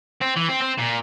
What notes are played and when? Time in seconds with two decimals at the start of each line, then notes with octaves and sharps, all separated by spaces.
0.21 C4
0.36 E3
0.49 C4
0.61 C4
0.78 A#2